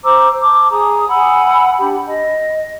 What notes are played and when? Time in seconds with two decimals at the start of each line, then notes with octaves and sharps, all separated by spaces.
0.03 C5 A#5 D6 E6
0.41 A5 D6
0.71 G#4 G#5 A#5 D#6
1.09 F#5 G#5 B5 E6
1.79 D4 G4
2.07 D#5